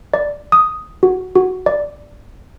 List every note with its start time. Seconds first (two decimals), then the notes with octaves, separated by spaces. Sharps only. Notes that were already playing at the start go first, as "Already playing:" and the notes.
0.14 D5
0.52 D#6
1.03 F#4
1.35 F#4
1.66 D5